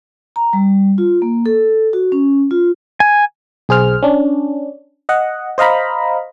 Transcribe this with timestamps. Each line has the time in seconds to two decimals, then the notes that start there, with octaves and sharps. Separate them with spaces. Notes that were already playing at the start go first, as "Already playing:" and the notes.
0.36 A#5
0.53 G3
0.98 F4
1.22 A#3
1.46 A4
1.93 F#4
2.12 C#4
2.51 F4
3.00 G#5
3.69 B1 G#4 C5 F6
4.03 C#4 D4
5.09 D#5 F#5
5.58 C5 D#5 F5 A#5 B5